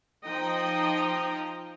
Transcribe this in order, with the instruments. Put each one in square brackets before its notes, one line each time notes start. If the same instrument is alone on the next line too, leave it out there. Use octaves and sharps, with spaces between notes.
[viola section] F3 D#4 D#5 G5